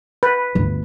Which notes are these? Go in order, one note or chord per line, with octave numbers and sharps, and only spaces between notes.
B4
G1 D2